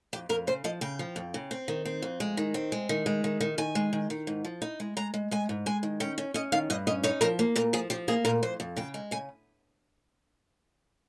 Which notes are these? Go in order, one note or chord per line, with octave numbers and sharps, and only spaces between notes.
F2 G4
F2 A#4
C#3 C5
F3 D#5
C#3 G5
F3
F2
C#3
C4
D#3
C4
F2
G#3
D#3
C4
G#3
D#3
G#3
D#3
D#3
D#3 G#5
G#3
D#3
D#3
G#2
F3
D#4
G#3
G#3 A#5
G#3
G#3 G#5
G#2
G#3 G#5
D#3
C#4 G5
C#4
C#4 D#5
D#3 F5
G2 D#5
C#4 D#5
D#4 C#5
F3 A#4
A#3
A#2 A#4
F3 G#4
F3 G4
A#3 G#4
A#2 A#4
F2 C5
F2
C#3 G5
G#3
C#3 G#5